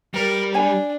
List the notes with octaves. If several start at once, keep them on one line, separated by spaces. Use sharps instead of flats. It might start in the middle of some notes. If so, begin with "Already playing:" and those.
G3 A#4
D4 C#5 G#5